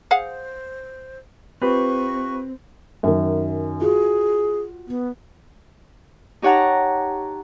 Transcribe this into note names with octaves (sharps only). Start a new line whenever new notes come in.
G#4 C5 F5 F#5
C4 F4 G4 B4 C#6
F#2 D#3
F4 F#4 G#4
B3
D#4 G4 C#5 F#5 A5 A#5